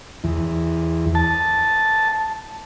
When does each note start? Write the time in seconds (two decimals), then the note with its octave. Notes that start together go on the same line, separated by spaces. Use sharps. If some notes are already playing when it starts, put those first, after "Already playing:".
0.24 E2
1.15 A5